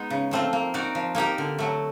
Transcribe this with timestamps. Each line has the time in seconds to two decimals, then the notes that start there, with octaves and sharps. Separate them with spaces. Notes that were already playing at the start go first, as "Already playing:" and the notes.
Already playing: G#3 B3 D#4
0.10 C#3
0.31 F3 A3 C4 F4
0.53 A#3
0.74 D#4 F#4 A#4 D5
0.95 F3
1.15 A#3 D#4 G4 A#4
1.38 D3
1.59 F#3 A3